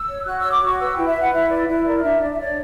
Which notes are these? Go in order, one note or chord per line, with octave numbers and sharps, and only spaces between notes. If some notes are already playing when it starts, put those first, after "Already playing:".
Already playing: E6
C#5
F#4 F#6
C#5 E6
D6
F#4 C#6
B4 E6
E4 G5
E5
B4
F#5
E4 E5
B4 D5
E4 E5
A#4 D5
D5
D4 E5
D4 D5
E5
C#5 D5